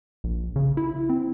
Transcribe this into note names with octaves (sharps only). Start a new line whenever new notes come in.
A#1
C#3
E4
C4